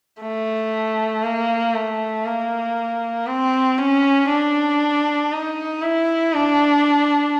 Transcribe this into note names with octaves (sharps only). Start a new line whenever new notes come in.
A3
A#3
A3
A#3
C4
C#4
D4
D#4
E4
D4